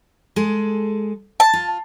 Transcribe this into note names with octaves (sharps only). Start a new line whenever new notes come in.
G#3 G#4 A4
A5
F4